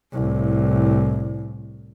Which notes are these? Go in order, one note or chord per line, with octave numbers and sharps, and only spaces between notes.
C2 A2